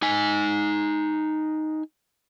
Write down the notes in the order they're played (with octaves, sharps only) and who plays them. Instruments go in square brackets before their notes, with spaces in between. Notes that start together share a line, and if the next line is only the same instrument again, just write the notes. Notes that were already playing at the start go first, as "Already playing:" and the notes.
[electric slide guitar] D#4 G#5